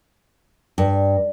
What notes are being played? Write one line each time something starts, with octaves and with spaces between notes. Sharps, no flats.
G2